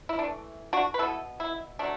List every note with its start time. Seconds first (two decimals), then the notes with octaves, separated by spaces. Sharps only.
0.09 E4
0.19 E3 A3 D4
0.73 D4 F#4
0.94 B4
0.99 B2 B3 E4 A4
1.40 E4
1.79 F#3 A3 D4